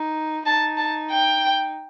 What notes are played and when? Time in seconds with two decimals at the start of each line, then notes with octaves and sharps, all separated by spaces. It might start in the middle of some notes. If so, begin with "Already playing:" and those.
Already playing: D#4
0.45 D#4 A5
0.77 A5
1.11 G5